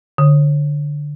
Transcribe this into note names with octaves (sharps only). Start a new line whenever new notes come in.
D3